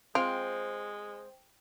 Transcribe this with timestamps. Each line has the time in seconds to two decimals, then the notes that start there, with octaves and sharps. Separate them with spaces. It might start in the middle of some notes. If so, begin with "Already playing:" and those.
0.15 G#3 C4 F4 C5 D7